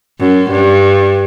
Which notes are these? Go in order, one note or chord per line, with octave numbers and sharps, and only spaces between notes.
F#2
G2